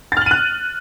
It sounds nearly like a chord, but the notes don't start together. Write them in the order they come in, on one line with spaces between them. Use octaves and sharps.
A6 F6 F#7 D#7 F#6